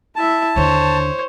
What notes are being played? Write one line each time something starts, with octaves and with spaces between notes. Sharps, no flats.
E4 E5 A5
D#2 D3 C5 C#5